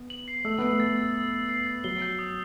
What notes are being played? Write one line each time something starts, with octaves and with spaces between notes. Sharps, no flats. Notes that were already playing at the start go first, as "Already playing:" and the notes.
Already playing: B3
F#7
C7
A3 E6
B3 E6
A3
A6
E6
E6
E6
C7
A6
F#3 G7
G6
D#6